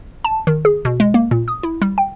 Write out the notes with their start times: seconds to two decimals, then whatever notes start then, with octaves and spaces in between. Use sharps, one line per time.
0.25 A5
0.47 D#3
0.65 G#4
0.85 B2
1.00 G#3
1.14 A#3
1.31 A#2
1.48 D#6
1.63 E4
1.82 G3
1.98 G5